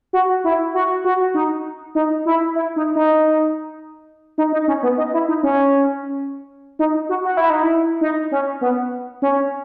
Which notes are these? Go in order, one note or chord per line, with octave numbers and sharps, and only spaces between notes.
F#4
E4
F#4
F#4
D#4
D#4
E4
E4
D#4
D#4
D#4
D#4
C#4
B3
D#4
E4
D#4
C#4
D#4
F#4
F#4
E4
D#4
E4
D#4
C#4
B3
C#4